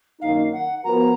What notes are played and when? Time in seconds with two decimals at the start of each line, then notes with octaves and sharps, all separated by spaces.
0.20 F#2 D#3 A#3 D#4 F5
0.52 F#5
0.84 F3 B3 F#4 A#4 A#5